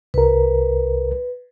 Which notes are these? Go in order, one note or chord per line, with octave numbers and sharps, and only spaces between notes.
C2 A#4 B4